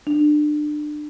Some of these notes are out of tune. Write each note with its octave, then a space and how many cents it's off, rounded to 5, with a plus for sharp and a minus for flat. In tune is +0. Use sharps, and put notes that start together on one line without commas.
D4 +30